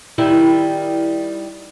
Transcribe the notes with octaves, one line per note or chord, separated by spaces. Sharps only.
D#3 G3 E4